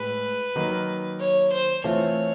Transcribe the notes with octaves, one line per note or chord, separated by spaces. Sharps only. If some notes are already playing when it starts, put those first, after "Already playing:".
Already playing: A2 G#3 B4
D#3 F#3 A#3 D#4
C#5
C5
E3 A3 C4 F4 C#5